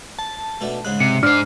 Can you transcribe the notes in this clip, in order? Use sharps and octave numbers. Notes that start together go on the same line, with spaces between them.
A5
B2 A3 D4
G#2 C#3 G#3 F#6
C3 C#7
G#2 D4 C5 D5 F6